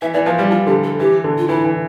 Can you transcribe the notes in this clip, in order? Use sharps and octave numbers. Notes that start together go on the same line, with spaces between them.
E3 E5
E3 D5
F3 B4
G3 G4
F3 F4
D3 G4
A4
E3 G4
D3
F4
E3 E4
E3